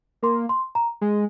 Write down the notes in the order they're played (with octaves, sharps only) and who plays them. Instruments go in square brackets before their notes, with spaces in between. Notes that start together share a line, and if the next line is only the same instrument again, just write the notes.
[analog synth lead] A#3 [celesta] C6
[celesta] C6
A#5
[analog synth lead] G#3